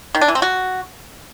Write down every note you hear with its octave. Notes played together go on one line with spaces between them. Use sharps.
D#3
D4
E3
C4
F#4